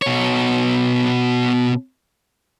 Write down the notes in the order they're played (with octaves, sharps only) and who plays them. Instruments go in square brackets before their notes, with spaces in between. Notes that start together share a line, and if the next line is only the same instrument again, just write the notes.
[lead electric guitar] B2 C#5